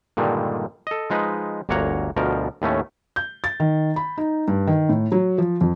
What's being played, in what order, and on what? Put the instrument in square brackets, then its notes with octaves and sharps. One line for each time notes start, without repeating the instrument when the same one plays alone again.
[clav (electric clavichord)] G2 A#2 D3 D#3 G3 G#3
A4 D#5
F3 G#3 D#4 B4
G1 D2 A#3 C#5 F#5 A#5
D2 B2 F3 A#4
D#2 A2 A3 C#4
[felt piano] G6
A6
D#3
B5
D#4
G2
D#3
A2
F#3
F3
F2